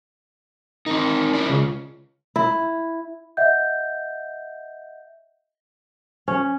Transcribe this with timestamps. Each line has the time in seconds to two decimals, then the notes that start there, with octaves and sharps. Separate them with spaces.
0.86 D#3 C4 D#4
1.33 C#4 E4 D5
1.49 C#2 C#3
2.36 E4
3.37 D#5 E5 F#5 G6
6.28 C#4